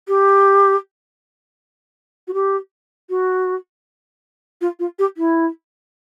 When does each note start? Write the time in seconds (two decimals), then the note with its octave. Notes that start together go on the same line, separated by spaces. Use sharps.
0.08 G4
2.28 F#4
2.34 G4
3.10 F#4
4.61 F4
4.79 F4
4.99 G4
5.17 E4